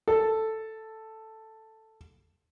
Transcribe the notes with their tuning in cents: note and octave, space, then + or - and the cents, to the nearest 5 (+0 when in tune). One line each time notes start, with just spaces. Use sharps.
A4 +5